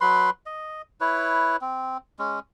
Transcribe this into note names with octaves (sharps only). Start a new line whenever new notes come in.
F#3 B4 B5 C6
D#5
E4 B4 C#5
C4
G#3 C#4